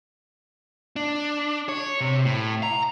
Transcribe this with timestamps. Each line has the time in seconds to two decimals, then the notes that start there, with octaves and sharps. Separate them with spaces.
0.96 D4
1.69 C#5
2.01 C3
2.25 A2
2.63 A#5